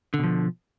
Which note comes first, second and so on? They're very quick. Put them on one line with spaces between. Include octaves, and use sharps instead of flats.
D3 B2 F3